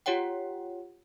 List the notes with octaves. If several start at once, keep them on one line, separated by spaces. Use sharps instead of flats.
F4 G4 C#5 F#5 G5